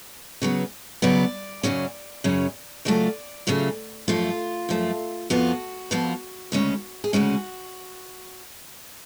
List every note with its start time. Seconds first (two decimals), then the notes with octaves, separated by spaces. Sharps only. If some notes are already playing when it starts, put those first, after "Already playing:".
0.42 C#3 F#3 B3
1.02 C#3 F#3 B3 D5
1.63 F#2 C#3 F#3 C#4
2.24 F#2 C#3 F#3 C#4
2.85 C#3 F#3 A3 F4 D5
3.47 C#3 F#3 A3 F4
4.08 F#2 F3 A3 F4
4.69 F#2 F3 A3
5.30 F2 F3 B3 F4 F#4
5.91 F2 F3 B3 F4
6.52 D2 C#3 G#3 C#4
7.04 G#4
7.13 D2 C#3 G#3 C#4 F#4